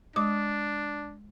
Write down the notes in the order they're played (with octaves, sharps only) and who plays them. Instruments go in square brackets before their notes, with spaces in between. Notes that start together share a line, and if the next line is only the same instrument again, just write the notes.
[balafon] G#3 D6 [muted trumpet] D4